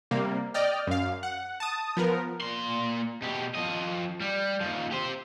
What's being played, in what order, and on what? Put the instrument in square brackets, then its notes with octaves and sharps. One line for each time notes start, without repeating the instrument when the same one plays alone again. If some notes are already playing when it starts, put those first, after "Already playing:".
[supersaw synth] C3 G3 A#3
D5 D#5 G5 F6
F#2 F5
F#5
A5 D#6
F3 B3 A#4
[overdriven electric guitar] A#2 C6
B2 G4
F3 D#5
G3
D#2 F3
G4 C5